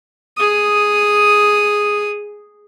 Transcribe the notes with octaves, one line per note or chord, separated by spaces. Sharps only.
G#4 D#6